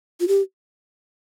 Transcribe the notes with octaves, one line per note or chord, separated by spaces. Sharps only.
F4
G4